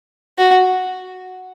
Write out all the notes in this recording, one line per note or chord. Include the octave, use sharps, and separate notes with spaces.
F#4